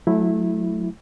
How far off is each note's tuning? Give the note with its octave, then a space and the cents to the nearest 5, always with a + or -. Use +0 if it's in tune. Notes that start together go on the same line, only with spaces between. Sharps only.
F#3 -25 A3 -25 E4 +0